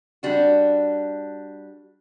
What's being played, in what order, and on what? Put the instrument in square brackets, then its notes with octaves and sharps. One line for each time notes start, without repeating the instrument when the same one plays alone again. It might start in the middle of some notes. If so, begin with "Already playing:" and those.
[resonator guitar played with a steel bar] G3 D4 F#4